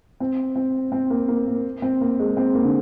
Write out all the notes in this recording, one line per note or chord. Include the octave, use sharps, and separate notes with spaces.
C4
C4
C4
A#3
A#3
A#3
C4
A#3
G#3
C4
A#3
D3